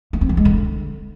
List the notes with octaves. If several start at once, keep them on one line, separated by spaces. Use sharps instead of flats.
A#3
C4
E3
G#3
D3